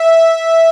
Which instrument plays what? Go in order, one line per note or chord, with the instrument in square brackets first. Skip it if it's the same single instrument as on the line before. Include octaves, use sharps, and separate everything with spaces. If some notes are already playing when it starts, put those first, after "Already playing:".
Already playing: [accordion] E5